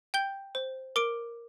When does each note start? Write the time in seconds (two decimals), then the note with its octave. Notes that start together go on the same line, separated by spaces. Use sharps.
0.14 G5 G6 G7
0.55 C5
0.96 A#4 D6 D7